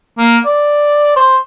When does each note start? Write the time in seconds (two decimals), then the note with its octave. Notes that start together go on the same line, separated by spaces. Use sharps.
0.18 A#3
0.46 D5
1.16 C5